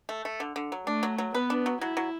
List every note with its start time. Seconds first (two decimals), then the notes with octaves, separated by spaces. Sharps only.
0.09 A3
0.25 A3
0.40 D3
0.56 D3
0.72 F#3
0.87 A3 D4
1.03 F#3
1.18 F#3
1.34 B3 B4
1.50 D4
1.66 F#3
1.81 F#3 E4
1.97 F#3